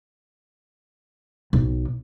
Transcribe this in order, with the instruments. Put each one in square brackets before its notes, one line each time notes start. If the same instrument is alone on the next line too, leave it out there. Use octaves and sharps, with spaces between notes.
[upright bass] B1